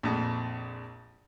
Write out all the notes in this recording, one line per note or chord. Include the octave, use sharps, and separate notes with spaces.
A#1 F2